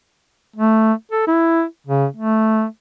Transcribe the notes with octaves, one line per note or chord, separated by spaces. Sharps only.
A3
A4
E4
C#3
A3